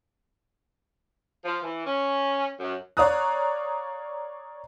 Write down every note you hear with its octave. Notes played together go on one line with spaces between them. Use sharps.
F3
E3
C#4
F#2
C#5 D5 F5 A#5 D#6 F#6